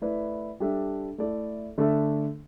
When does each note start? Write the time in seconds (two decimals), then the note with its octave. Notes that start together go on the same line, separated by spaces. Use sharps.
0.01 A3 E4 B4 D5
0.60 G3 D4 A4 E5
1.18 A3 E4 A4 D5
1.78 D3 A3 D4 A4 E5